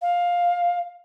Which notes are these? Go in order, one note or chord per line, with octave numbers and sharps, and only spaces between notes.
F5